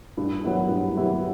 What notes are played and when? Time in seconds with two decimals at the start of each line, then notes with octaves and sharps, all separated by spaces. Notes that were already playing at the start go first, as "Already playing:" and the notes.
0.17 G2
0.44 F#3 B3 E4 G4
0.68 G2
0.95 F#3 B3 E4 G4